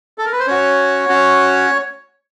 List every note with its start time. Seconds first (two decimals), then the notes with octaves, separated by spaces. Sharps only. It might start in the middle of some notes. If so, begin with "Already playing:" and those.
0.18 A4
0.25 A#4
0.33 B4
0.40 C5
0.47 C#4 F#4 C#5
1.09 C#4 F#4